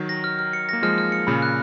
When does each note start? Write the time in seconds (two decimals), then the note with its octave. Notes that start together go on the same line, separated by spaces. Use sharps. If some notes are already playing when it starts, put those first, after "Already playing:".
Already playing: D#3 F#3
0.09 A#6
0.24 F6
0.39 F6
0.53 C#7
0.69 A#3 A#6
0.82 F3 G#3 F6
0.98 F6
1.12 C#7
1.27 A#2 C#3 B5
1.42 F#6